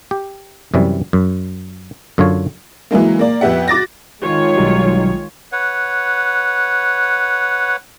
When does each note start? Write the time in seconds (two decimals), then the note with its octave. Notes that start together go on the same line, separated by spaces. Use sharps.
0.11 G4
0.74 F#2 C3 E3 G3
1.13 F#2
2.18 F#2 D3 F4 C#5
2.91 E3 F#3 G#3 A#3
3.19 A#3 D5
3.41 F2 B3 G4 E5 F#5
3.68 F#4 D6 A6 A#6
4.20 D#3 G#3 F4 C#5
4.56 B1 F#3 G3
5.52 B4 C#5 F#5